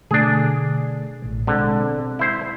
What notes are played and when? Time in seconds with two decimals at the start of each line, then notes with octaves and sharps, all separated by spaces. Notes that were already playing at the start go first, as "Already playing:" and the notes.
0.11 B2 D3 A3 D4 G#4
1.24 A1 A2
1.47 B2 D3 G#3 C4
2.19 E4 C5